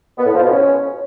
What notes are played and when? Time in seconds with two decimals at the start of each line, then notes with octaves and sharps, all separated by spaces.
0.18 B3
0.26 A2
0.34 F3
0.42 B2
0.50 C#4